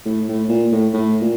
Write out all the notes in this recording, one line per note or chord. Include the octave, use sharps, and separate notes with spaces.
A2
A2
A#2
A2
A2
A#2